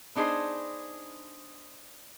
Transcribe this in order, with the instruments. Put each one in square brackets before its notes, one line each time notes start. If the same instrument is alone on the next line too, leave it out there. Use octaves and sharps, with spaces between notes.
[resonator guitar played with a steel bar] B3 D4 D#4 G#4 C5